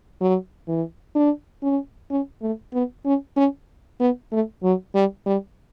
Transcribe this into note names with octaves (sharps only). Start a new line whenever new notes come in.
F#3
E3
D4
C#4
C#4
A3
B3
C#4
C#4
B3
A3
F#3
G3
G3